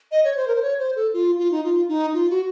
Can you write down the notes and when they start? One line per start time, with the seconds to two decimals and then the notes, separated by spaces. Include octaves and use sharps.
0.12 D#5
0.24 C#5
0.37 C5
0.48 A#4
0.55 C5
0.62 C#5
0.79 C5
0.96 A4
1.14 F4
1.38 F4
1.51 D#4
1.64 F4
1.89 D#4
2.14 F4
2.30 F#4